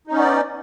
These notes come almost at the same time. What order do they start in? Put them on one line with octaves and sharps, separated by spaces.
D#4 C#4 B3 D5